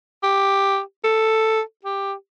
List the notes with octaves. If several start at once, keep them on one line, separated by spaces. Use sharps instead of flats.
G4
A4
G4